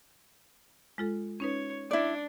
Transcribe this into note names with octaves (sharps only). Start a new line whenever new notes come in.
G#3 F4 A4
C#4 D#4 B4 C#5
D4 E4 D5